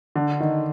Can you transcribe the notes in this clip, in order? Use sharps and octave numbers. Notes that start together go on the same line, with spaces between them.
D3
D#3